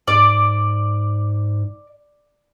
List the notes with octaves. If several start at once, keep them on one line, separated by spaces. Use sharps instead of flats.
G#2 D5